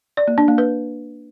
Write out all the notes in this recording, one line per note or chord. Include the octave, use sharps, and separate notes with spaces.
D5
A#3
D4
A#3
B4